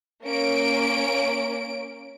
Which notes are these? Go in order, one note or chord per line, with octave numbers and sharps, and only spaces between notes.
A#3 C#4 D7